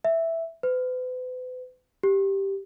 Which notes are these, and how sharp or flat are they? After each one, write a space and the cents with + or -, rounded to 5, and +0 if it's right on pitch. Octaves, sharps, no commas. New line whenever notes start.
E5 +0
B4 +40
G4 -5